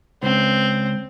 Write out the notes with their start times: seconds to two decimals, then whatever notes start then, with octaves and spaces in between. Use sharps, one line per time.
0.23 C#2 C4